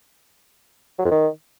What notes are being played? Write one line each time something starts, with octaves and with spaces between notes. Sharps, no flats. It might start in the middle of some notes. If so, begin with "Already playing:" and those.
F#3
F2
D#3